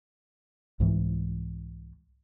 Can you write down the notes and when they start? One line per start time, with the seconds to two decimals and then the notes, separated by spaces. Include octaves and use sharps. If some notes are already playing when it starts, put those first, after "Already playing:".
0.80 C2 G#2 E3